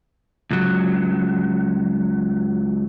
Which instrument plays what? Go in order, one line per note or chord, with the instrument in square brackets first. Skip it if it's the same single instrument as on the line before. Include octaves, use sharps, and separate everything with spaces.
[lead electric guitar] C#2 F#3